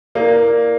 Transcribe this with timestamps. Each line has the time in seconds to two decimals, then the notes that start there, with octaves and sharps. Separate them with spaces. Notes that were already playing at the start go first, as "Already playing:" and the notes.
0.15 A#3 E4 A#4 D5